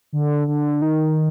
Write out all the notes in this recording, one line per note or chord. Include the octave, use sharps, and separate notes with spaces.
D3
D3
D#3